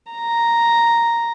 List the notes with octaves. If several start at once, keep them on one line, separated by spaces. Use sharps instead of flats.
A#5